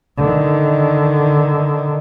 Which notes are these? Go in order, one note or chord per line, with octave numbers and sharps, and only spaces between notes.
D3 D#3